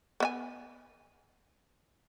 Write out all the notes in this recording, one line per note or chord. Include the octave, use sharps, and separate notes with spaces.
B3 E5 G#5